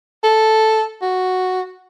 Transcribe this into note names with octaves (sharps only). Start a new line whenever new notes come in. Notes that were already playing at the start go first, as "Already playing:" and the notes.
A4
F#4